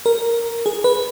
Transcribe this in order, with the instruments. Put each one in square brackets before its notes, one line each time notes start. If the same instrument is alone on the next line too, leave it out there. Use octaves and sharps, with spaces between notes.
[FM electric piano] A#4
G#4
B4